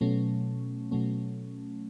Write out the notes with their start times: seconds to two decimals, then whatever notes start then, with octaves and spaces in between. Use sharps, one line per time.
0.01 B2 F#3 A3 C#4
0.91 B2 F#3 A3 C#4